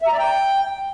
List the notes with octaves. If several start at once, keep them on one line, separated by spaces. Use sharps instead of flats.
E5
A#5
D5
G5